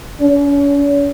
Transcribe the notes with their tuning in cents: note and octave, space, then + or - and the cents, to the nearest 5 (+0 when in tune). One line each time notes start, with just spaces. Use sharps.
C#4 +40